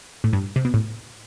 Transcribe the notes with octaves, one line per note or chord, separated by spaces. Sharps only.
A2
G2
C3
B2
A2